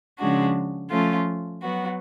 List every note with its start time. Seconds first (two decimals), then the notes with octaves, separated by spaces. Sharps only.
0.19 C#3 F3 G#3 D4 F#4
0.91 F3 A3 C#4 F4
1.62 F#3 B3 F#4